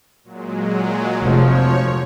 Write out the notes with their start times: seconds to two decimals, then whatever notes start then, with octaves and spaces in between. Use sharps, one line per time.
0.24 A#2 F#3 G#3
1.20 F1 F3 C#5